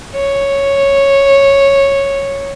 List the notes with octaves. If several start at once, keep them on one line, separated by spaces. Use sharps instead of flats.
C#5